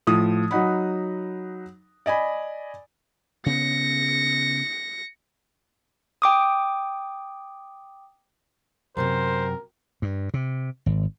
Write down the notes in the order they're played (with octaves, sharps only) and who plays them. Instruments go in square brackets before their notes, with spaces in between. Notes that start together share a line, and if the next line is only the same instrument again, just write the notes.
[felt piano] A2 F3 D#6
F#3 D#4 F#5 B5
D5 D#5 G#5 B5
[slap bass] C#3 B3 [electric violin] A#6 C#7
[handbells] G5 D6 D#6
[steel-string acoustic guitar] F#2 A2 C3 [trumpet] A#4 [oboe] C5
[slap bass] G2
C3
G#1